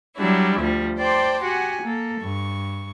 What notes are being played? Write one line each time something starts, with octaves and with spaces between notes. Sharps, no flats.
F#3 G3 D4 E4
D2 F3 G3
C5 D5 G5 A5 C6 D6
F#4 G4 F#5 G#5
A#3 A4
G2 C#6